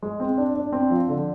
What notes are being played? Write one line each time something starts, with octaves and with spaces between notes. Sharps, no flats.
G#3
C4
D4
D4
C4
F3
D3